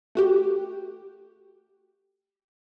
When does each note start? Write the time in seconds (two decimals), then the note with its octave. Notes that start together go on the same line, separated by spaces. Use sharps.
0.15 A3 F#4 G4